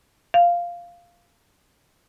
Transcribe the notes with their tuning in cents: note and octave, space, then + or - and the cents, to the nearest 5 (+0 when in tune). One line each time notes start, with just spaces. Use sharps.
F5 -5